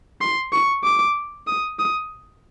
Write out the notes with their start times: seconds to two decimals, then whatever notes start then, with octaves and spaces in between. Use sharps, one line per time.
0.21 C6
0.53 C#6
0.84 D6
1.47 D#6
1.79 D#6